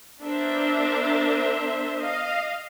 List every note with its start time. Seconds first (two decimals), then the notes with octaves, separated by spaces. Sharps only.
0.22 B3 D4 A#4 C5 E5
1.97 D#5 F5